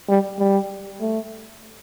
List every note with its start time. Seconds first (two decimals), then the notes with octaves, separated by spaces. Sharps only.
0.09 G3
0.39 G3
1.01 A3